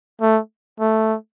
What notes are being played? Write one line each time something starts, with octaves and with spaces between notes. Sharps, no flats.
A3
A3